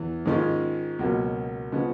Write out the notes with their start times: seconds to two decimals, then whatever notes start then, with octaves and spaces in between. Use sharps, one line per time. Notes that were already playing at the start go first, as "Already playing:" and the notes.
Already playing: E2 E3
0.25 G#2 D#3 G#3 C#4 F4
0.99 C#2 B2 F#3 A#3
1.72 C#3 F3 G#3 B3